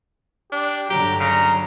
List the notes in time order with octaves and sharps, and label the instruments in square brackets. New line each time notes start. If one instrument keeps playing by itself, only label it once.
[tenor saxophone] D4 [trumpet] G4
[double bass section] G1 D3 F#3 [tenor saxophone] G4 [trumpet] A#5
[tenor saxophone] C#3 [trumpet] A#5